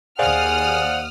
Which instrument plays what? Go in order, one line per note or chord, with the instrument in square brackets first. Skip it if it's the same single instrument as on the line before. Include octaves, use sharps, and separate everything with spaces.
[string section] D#2 D#6 F6 [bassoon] G#4 [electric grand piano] C5 D5 F5 [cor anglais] F#5